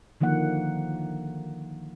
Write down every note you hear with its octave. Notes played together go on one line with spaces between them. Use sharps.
D3 D#3 F3 A#3 F#5